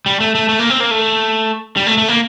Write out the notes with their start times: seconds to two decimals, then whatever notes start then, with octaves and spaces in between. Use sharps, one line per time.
0.06 G3
0.20 A3
0.35 A3
0.49 A3
0.59 A#3
0.70 C4
0.80 A#3
0.91 A3
1.77 G3
1.87 A3
1.98 A3
2.08 A#3